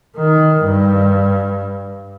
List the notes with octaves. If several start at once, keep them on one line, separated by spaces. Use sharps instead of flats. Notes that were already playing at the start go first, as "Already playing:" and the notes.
D#3
G2